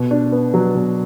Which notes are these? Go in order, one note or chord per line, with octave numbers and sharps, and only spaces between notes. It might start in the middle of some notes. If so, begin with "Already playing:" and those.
Already playing: B2
D4
B3
F#3
B2